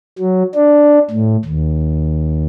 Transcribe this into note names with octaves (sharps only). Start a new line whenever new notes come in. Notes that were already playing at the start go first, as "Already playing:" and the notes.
F#3
D4
A2
D#2